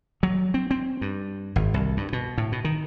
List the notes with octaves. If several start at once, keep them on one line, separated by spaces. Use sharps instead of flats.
F#3
C4
C4
G2
G#1
C2
G2
B2
A2
B2
D#3